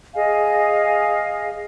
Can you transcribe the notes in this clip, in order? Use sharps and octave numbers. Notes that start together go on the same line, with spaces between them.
G#4 D#5 F5 G#5